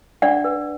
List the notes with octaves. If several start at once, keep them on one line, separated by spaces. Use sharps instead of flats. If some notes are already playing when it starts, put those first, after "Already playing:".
D4 D5 F#5
B4